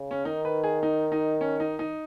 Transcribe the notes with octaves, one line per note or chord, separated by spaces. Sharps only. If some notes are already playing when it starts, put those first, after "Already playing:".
Already playing: C#3
C#4
D#3 D#4
B4
G#4
D#4
D#4
C#4
D#4
D#4